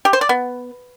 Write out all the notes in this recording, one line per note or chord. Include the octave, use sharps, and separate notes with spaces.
G4
C5
D5
B3